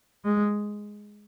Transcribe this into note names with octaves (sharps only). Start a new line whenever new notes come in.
G#3